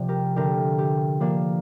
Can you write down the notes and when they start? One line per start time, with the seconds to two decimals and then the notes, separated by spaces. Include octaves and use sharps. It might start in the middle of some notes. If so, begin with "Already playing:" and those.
Already playing: C3 F3 C4 D5
0.08 G4 A#4
0.36 D3 A3 D4 G4 A#4
0.78 G4
1.20 F3 A#3 D4